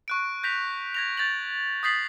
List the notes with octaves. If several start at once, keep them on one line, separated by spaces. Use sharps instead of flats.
C#6 F#6 D7
G6 A#6 B6 F7
G#6 A#6 F7
G6 A6 F7 F#7
D#6 G6 A6 B6 C7 F#7